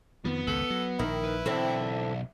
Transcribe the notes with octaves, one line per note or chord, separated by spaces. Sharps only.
F2 D#3 F3 B3
G#1 C#2 F#2 A4
F#3
A#1 D#3 E4
B4
B1 D3 E3 C4 A4 E5